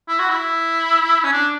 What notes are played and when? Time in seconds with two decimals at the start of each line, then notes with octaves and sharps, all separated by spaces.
0.08 E4
0.19 F#4
0.29 E4
1.24 C#4
1.32 D4